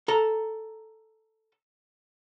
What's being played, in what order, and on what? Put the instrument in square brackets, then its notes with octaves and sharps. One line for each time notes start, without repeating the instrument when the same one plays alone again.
[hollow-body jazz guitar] A4 A#5